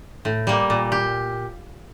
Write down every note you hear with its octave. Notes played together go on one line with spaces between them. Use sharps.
A2
G3 A#3
A#2
G4